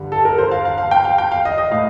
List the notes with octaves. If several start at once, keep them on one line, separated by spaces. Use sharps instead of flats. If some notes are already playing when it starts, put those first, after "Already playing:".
Already playing: G2 D3 G3
A4
A#4
C5
F5
F5
F5
G5
F5
G5
F5
D#5
D#5
A2 F5